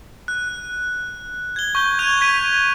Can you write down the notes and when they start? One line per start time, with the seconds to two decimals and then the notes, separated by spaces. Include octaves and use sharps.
0.28 F#6
1.56 G#6 G7
1.75 C#6 G6 G7
1.99 F#6 G#6 D#7 F7
2.21 G#6 B6 D#7